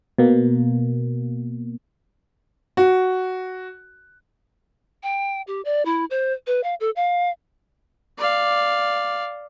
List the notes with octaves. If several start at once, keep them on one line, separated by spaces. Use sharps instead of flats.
B2 A#3
F#4
G5
G4
D5
E4
C5
B4
F5
A4
F5
D5 F5